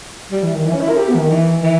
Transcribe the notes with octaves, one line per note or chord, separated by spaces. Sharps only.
G3
E3
D#3
E3
C#4
E4
A#4
G4
B3
E3
D#3
E3
E3